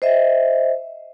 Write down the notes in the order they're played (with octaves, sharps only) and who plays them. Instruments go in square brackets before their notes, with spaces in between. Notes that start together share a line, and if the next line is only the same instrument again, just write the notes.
[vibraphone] C5 D#5 E5